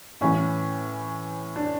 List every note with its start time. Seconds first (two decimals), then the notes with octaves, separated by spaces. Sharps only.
0.21 A2 E3 C#4
1.56 D4